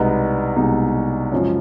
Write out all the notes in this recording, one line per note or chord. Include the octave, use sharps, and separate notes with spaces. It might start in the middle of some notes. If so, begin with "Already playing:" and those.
Already playing: C2 B2 G#3 B3 D#4
C2 B2 G#3 B3 D#4
F#2 C#3 F3 G#3 C#4